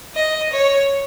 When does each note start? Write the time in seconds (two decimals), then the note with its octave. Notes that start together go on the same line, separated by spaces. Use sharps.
0.15 D#5
0.53 C#5